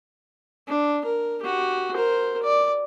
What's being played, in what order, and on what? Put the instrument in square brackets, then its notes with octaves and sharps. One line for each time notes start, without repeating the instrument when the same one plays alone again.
[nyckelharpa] D4
A#4
F#4 G4
A#4 C5
D5